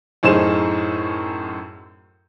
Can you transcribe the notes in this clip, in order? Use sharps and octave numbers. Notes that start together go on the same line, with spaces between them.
F#2 A2 D#4 G#4 C5 E7